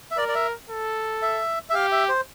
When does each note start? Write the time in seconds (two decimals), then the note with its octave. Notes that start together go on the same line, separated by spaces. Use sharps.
0.11 E5
0.17 A#4 D5
0.28 D5
0.35 E5
0.70 A4
1.22 E5
1.70 E5
1.74 G4 F5
1.92 E5
2.09 C5